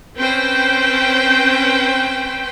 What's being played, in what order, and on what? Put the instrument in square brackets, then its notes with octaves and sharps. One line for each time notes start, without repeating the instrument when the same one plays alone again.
[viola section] C4 C#4 B4 C5 G5